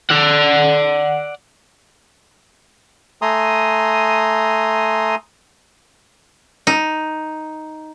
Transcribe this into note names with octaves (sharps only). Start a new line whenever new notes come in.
D5 F#5
A3 G#5 A#5 C6 D#6
D#4